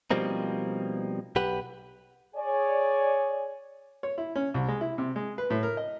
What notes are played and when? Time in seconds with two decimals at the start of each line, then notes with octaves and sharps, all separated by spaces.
0.11 B2 F3 G3 A#3 C4 D#4
1.36 B1 G4 B4 F#5
2.35 G#4 C#5 D5 G#5
4.03 C#5
4.18 E4
4.35 C#4
4.54 C2
4.68 G#3
4.81 E4
4.98 C3
5.16 G#3
5.38 B4
5.50 A2
5.63 A#4
5.77 D#5